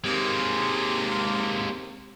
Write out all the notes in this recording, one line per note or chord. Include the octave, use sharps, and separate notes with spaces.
D#2 C3 G#3 A#3